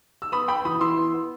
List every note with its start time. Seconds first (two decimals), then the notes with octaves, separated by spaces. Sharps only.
0.22 E6
0.32 B3 B5 D#6
0.48 B3 G5 B5
0.65 E3 B5 D#6
0.81 E3 C6 E6
0.97 B3
1.14 B3